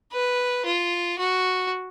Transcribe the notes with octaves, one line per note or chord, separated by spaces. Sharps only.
B4
F4
F#4